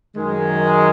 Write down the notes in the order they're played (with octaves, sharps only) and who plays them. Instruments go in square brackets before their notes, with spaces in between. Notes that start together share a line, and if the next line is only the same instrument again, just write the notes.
[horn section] F#2 D#3 G#3